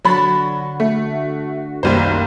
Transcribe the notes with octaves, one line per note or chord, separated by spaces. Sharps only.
D3 F#3 F#4 B5 A6
A3
F1 C2 F#2 D#3 A#3 C5